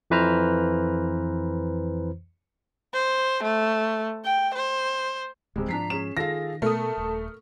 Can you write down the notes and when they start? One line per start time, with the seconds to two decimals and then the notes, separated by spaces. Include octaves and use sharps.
0.10 F2 E3 B4 C5 A#5 F6
2.93 C5
3.43 A3
4.25 G5
4.54 C5
5.56 D1 C3 G3 G#3
5.69 G#2 F3 D4 A#5 B6 C7
5.90 C#4 G#4 E7
6.17 D#3 F4 G#4 A4 F5 A#6
6.62 B2 A3 B3 A#4 A5 D#6
6.97 D#1